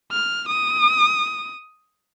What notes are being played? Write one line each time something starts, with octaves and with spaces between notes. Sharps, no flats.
F6
D#6